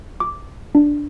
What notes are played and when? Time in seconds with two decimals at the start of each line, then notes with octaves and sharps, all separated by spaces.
0.20 D6
0.75 D4